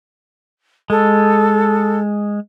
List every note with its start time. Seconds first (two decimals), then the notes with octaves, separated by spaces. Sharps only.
0.90 G#3 A4